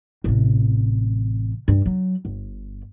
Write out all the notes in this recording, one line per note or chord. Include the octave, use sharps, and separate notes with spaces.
A1 C3
G2
F#3
G1